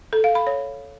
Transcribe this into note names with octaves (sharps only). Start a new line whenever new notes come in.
A4
F5
B5
C#5